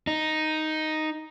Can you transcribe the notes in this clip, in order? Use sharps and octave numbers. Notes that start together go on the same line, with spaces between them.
D#4